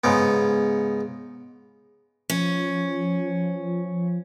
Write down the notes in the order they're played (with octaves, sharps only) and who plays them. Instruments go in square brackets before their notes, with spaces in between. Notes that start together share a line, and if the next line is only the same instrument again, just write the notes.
[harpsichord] G#2 C#3 B3
[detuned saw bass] F3 [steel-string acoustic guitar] C#4